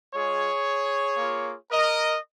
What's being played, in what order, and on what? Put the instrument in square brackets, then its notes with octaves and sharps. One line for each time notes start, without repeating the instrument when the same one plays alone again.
[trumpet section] G#3 F4 G#4 C#5
A#3 F4
A#4 D#5